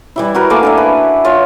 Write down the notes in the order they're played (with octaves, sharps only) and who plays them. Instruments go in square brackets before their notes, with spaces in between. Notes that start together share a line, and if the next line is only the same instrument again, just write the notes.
[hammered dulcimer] E3 G3 E4
F#4 A#4 B4
A3 A#3 G#5 D6
D4 A#4 E5
B4
F4 C#5 G#5